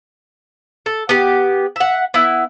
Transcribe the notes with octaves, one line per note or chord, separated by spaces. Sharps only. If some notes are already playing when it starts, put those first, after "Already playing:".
A4
B3 G4
E5 F#5
B3 E4